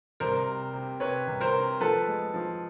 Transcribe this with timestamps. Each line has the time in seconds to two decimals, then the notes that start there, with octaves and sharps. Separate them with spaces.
0.20 C2 A#4 C5
0.47 C3
0.73 C3
1.00 C3 B4 C#5
1.27 C2
1.41 A#4 C5
1.54 C3
1.81 F3 A4 B4
2.08 G#3
2.34 F3